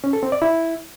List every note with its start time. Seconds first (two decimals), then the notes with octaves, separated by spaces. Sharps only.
0.04 C#4
0.13 A4
0.23 C4
0.32 D5
0.42 E4